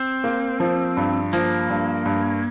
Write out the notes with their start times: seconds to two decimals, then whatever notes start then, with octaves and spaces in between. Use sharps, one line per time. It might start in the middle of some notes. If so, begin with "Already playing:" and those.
Already playing: C4
0.24 A#3
0.60 F3
0.97 G2
1.33 F3 A#3
1.70 G2
2.06 G2